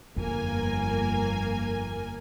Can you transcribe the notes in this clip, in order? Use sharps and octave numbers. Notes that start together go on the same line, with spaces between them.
G1 F2 A#3 G#5